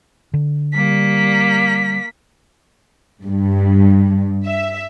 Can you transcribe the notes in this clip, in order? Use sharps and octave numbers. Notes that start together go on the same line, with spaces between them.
D3
G3 A#3 B6
G2
E5